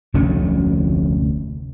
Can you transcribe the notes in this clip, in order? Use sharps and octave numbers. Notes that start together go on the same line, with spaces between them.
F1 D2 D3 C#4